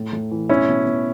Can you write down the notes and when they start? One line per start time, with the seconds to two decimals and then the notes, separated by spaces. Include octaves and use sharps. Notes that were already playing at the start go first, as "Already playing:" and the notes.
Already playing: A2
0.13 A2
0.31 E3
0.49 B2 C#4 E4
0.68 B2
0.86 B2